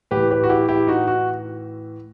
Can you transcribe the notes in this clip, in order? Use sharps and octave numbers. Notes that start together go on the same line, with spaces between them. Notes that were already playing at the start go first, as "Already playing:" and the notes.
A2 E3 G4 B4
G4 B4
F#4
E4 G4
E4 G4
D#4 F#4
F#4